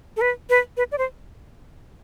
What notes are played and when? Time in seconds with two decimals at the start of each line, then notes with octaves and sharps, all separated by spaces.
0.17 A4
0.21 B4
0.50 B4
0.77 B4
0.92 D5
0.98 C5